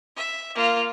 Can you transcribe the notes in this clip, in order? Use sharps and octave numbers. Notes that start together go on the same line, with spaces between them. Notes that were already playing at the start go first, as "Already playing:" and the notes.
E5
A#3 F4